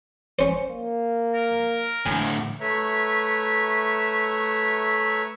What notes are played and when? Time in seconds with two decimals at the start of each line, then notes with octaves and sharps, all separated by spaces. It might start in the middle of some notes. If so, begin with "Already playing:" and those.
0.39 C#4 C5
0.70 A#3
1.34 A#4
2.06 A2 D3 G#5
2.61 A3 B4 C#5 E5 A#5 C#6